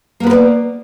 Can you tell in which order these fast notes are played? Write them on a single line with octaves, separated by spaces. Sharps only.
A#3 B3 B4 A#4 D5